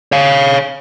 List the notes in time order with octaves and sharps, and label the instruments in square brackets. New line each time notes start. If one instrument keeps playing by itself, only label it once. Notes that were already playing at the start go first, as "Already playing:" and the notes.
[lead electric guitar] C#5 F5